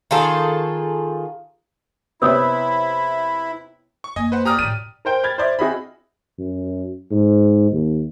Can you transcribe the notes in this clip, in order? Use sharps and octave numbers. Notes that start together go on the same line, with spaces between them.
D#3 F4 G#4 A4
C3 B3 E4 C#5 D#6 E6
C#6
F#2 A#3 D#5 G#5
B4 C5 F#5
G4 D5 A#5 D#6 F6
A2 F#3 D#7
A#4 C5 G5
B5 F6 G#6 A6
C5 D5 E5
C4 F#4 G#4 D#5 E5 B5
F#2
G#2
D#2